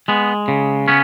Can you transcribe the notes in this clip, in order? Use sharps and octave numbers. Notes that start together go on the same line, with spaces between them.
G#3 B3
C#3
B3 C#4